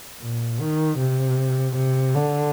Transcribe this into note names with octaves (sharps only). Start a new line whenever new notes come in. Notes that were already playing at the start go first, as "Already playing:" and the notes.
A#2
D#3
C3
C3
D3